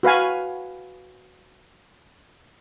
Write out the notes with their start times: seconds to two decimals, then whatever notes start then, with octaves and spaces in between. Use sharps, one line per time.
0.03 F#4 B4 F5 G#5